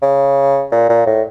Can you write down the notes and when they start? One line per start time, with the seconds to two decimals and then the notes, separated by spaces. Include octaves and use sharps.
0.02 C#3
0.72 A#2
0.89 A#2
1.07 A2